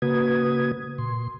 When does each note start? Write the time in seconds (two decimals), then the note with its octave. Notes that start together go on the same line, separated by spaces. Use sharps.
0.02 C#3 A#3 F#4 B4 D#6 G#6
0.98 A#2 C6